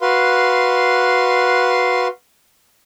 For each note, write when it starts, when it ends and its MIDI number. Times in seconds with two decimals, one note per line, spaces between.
0.01 2.08 66
0.01 2.08 71
0.01 2.08 77
0.01 2.08 84